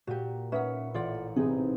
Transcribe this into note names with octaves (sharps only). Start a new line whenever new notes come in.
A#2 F#4 G4
C#4 D#4 B4 E5 F#5
A1 F4 D5 F#5
C3 E3 C4 D#4 G#4